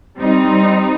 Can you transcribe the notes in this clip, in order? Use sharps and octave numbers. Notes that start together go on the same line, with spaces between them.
G3 C4 D#4